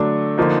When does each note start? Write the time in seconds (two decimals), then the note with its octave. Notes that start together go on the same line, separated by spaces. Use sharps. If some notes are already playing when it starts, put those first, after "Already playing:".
Already playing: D3 F#3 A3 D4
0.38 D3 F3 A#3 D#4